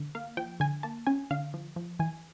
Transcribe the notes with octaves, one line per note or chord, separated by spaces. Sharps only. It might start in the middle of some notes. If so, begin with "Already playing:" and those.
Already playing: D3
A#3 F5
F3 G5
D3 G#5
A#3 A5
C#4 G#5
D3 F5
F3
F3
E3 G#5